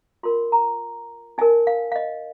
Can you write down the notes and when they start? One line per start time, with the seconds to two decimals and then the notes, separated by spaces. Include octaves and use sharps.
0.23 F4 A#4 C6
0.52 A#5
1.38 D#4 A#4 G#5
1.67 F5
1.92 F5
1.96 D#5